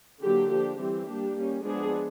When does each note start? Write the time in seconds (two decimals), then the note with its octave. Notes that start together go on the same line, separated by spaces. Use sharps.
0.23 D3 F#3 A#3 D4 G4
0.51 F3 A#3 D4 G4
0.79 E3 G3 C4 G4
1.07 G3 A#3 D4
1.35 G3 A#3 C#4
1.63 F3 G#3 B3 D4 G#4